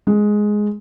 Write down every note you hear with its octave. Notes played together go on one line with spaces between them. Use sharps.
G#3